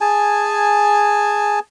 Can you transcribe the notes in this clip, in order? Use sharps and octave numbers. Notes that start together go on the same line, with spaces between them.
G#4 G#5 A5